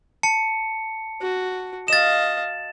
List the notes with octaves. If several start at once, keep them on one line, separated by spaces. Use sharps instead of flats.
A5 C#7
F#4
D#5 F5 A6 E7